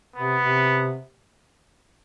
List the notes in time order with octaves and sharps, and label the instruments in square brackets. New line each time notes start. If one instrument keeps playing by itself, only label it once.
[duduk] C3 [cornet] B3
[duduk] C3